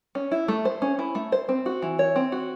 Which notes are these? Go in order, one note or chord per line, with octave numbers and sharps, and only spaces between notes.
C#4
E4
A3
C5
C#4
E4
A3
C5
C4
F#4
E3
C#5
C4
F#4